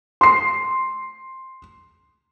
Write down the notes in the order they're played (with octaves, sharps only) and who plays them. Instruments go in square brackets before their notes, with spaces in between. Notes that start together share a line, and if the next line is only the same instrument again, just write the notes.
[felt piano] C6 C7